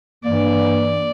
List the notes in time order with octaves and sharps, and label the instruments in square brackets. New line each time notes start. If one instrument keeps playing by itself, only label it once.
[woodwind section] G2 E3 A#3 [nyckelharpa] D5